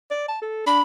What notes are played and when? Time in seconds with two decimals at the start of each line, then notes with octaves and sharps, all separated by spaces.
0.11 D5
0.28 A5
0.42 A4
0.67 D4 B5